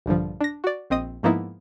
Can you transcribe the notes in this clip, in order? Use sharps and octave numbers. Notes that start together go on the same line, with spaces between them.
A#1 G2 D3 F3
D4 A#6
F#4 D5
A#1 C4 D#5 D#6
G#2 F3 A#3 B3 D#4 E4